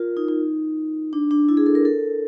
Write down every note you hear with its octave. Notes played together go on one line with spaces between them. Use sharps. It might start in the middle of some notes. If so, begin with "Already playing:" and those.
Already playing: F4 A#4
D#4
D#4
D4
D4
E4
G#4
A4
A#4
A4